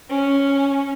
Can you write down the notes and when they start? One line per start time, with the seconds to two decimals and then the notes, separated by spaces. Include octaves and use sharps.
0.10 C#4